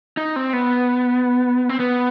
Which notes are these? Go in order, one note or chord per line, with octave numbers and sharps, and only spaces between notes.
D#4
C4
B3
C4
B3